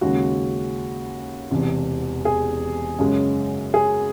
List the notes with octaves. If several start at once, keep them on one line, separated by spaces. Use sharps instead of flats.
D#2 C#3 G#3 F#4
E1 E2 C3
G#4
F#2 C#3 G#3
G#4